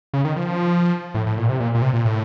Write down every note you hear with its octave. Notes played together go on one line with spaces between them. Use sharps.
C#3
D#3
F3
A2
A2
A#2
C3
A#2
A#2
C3
A#2
A2